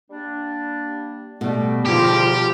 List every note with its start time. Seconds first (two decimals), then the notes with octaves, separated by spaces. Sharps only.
0.10 G3 A#3 D4
1.41 B2 G3 A3
1.86 E2 D3 F3 D#4 G4